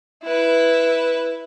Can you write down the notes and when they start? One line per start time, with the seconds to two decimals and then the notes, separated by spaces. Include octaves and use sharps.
0.24 E4 B4